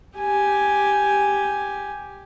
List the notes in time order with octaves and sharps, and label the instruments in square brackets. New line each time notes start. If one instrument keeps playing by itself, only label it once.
[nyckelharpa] G4 G#5